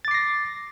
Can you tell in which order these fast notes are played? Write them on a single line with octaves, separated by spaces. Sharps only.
A6 D6 C7 A#6